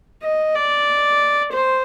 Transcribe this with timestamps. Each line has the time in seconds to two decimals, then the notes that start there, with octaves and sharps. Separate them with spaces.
0.23 D#5
0.55 D5
1.52 C5